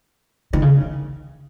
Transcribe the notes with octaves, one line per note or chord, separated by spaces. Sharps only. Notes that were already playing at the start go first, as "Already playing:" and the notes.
D#3
C#3